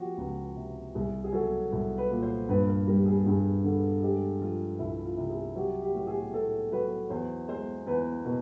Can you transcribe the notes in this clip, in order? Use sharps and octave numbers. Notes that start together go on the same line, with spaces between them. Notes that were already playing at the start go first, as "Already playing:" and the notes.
Already playing: F3 F#4 G4
C#2
C3
C2 G#4
G#4
F#3 A4
C2
B4
A#2
C5
G2 B4
A#4
G3 A#4
G#4
G2 G#4
D3
G#3 G4
F3 F4
C2 E4
F4
C3
G#4
F#3 G4
G4
A2
G#4
A2 A4
F#3 B4
E2 C5
G#3 C5
E2 B4
B2 A#4